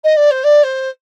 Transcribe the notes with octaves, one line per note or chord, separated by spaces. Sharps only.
D#5
D5
C5
D5
C5